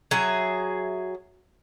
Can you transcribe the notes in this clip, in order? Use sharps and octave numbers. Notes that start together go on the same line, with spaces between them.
F#3 G#4 E5